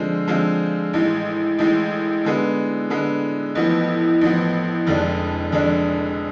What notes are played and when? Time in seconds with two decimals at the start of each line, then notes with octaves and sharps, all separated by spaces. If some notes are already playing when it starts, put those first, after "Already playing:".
Already playing: D3 F3 G#3 C4 F4
0.28 D3 F3 G#3 C4 F4
0.93 A1 A2 G#3
1.58 A1 A2 G#3
2.25 D3 G#3 B3
2.90 D3 G#3 B3
3.55 A1 A2 F3 B3
4.21 A1 A2 F3 B3
4.87 F1 F2 D3 G#3 D4
5.52 F1 F2 D3 G#3 D4